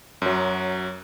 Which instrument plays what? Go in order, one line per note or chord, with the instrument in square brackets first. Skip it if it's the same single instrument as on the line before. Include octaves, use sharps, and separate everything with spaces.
[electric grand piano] F#2 F#3